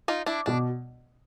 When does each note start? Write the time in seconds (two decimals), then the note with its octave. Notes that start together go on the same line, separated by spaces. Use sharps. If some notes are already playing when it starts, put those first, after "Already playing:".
0.08 D#4 F4
0.26 D4 E4
0.46 B2 D4